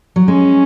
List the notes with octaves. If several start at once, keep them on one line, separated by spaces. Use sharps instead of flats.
F#3
G#3 C#4